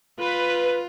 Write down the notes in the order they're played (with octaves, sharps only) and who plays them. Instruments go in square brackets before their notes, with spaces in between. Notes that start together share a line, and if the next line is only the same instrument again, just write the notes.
[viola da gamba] F4 [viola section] B4